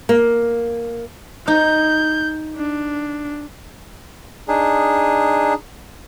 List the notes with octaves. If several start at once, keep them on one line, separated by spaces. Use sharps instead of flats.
A#3
D#4 G6
D4
D4 D#4 G#4